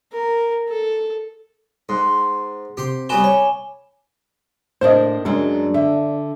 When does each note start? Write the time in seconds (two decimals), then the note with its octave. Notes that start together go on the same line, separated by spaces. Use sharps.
0.13 A#4
0.69 A4
1.89 G#2 F#5 C6 F#6
2.77 C3 G4 C6
3.09 G3 B3 F#4 G#5 B5 D6 E7 G7
3.24 C#5
4.81 A2 A#3 D4 C5 D#5
5.25 F#2 F#3 G#3 A#3 D4
5.74 D3 E5